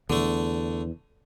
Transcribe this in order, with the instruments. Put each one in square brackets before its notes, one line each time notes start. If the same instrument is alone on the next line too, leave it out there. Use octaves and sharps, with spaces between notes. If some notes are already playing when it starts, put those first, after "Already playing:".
[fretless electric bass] E2 [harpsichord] D3 A3